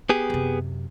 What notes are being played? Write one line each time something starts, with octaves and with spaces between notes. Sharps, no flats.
B3 G4 G#4
F#2 C3